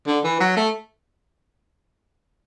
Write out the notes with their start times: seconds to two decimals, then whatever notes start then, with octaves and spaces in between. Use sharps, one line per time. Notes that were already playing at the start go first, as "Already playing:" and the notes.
0.07 D3
0.24 E3
0.40 F#3
0.57 A3